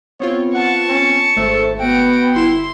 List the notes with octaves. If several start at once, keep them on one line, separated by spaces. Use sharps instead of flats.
B3 C4 F4 C#5
F#5 A5 C#6
C#4
G#1 A3 A4 C5 E5
B3 F#4 G5 D7
G1 E4 C6 E7